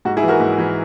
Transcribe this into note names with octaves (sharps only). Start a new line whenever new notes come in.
G#2 F#4
E4 G#4
E3
F#4 A#4
G#2
E3